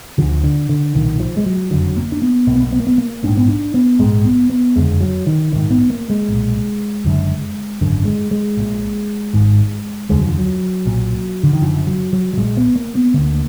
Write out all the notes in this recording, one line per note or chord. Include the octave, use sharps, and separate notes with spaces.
D2 D3 F3
D3
D3
B1 A#2 D#3
F3
G#3
F#3
F#1 F2 D3 F#3
A#3
D4
B3
B1 B2 A#3
B3
A#3
B3
A#3
B3
A#3
A#1 G#2 D4
B3
D4
B3
A#1 G#2 G#3
B3
B3
F#1 F2 D3 G#3
F#3
D#3
A#1 G#2 D#3
B3
A#3
G#3
B1 A#2
F#1 F#2 D3
G#1 F#2 D3
G#3
G#3
A#1 A#2
G#1 G#2
F1 D#2 D3 G#3
F#3
F3
F#3
B1 A#2
D3
D#3
F#1 F#2 D3 F3
F#3
F#3
F#3
A#1 A#2 G#3
B3
A#3
B3
D2 D3 A#3